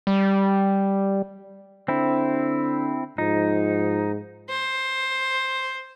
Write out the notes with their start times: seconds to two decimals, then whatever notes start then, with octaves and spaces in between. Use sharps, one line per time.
0.07 G3
1.88 D3 C4 E4
3.18 G#2 F3 D#4
4.49 C5